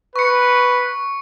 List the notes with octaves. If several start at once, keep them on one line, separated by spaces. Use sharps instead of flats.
B4 C#6 C#7